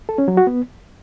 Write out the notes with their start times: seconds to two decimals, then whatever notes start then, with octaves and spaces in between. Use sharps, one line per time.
0.09 A4
0.18 C#4
0.28 F#3
0.37 F#4
0.47 B3